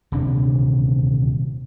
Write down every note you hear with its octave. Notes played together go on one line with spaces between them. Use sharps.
D#1 D2 C3 D4